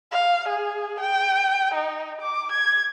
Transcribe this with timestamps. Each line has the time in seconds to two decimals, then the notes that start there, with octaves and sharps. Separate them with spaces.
0.12 F5
0.49 G#4
1.00 G5
1.74 D#4
2.21 D6
2.52 G#6